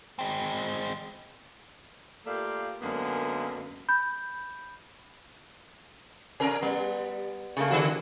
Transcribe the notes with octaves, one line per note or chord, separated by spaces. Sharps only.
G#3 C4
A3 A#3 F4 G4 D5 F5
F#2 D3 G#3 A#3 B3 C#4
B5 G6
C3 A#4
G3 B3
C#3 A3 A#3
D3 G3 F#4